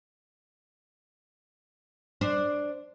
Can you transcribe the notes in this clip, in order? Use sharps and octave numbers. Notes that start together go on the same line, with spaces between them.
D4 C5